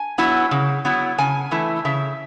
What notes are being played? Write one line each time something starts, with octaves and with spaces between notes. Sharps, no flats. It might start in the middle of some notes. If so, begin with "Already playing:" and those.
Already playing: G#5
F#3 B3 E4
C#3
F#3 B3 E4
C#3 G#5
E3 A3 E4
C#3 E5